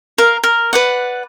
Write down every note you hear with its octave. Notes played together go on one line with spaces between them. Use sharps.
A#4 F5
A#4
B4 D5 F#5